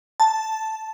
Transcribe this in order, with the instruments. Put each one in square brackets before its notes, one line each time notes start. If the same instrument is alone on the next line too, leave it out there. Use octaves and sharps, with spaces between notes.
[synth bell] A5